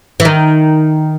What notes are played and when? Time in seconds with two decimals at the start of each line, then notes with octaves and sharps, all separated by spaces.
0.20 E3
0.25 D#3